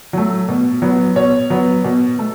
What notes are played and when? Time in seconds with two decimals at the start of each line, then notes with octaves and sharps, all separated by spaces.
0.13 F#3 A3
0.48 B2
0.82 F#3 B3
1.16 B2 C#5
1.50 F#3 B3
1.84 B2
2.19 A3